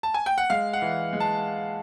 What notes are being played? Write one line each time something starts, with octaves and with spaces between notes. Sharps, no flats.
A5
G#5
G5
F#5
G#3 F5
F#5
E3
G#3
A5